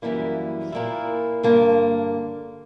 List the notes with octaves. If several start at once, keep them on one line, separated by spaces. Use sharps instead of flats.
F#2 E3 G3 A#3 E4
A#2 A#3 E4
G2 D3 A#3